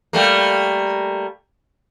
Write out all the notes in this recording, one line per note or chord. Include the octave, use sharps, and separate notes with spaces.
G3 A3 A#3